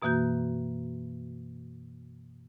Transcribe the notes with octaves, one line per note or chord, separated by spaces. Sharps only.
F#2 B2 E3 A#3 F#4 G6